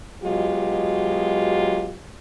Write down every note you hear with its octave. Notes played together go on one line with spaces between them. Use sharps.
B2 F#3 G#3 F4 G4